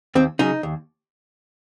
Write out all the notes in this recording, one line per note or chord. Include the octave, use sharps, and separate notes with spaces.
D#2 C4
C#3 F#3 D#4
D#2